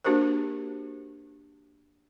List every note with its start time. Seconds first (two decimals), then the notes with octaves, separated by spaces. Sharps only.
0.04 A#3 D4 F#4 G4 A#4 C5